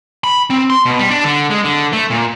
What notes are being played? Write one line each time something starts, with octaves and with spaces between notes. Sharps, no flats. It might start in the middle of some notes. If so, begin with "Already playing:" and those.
B5
C4
C6
B2
G3
D4
D3
G#3
D3
A3
A#2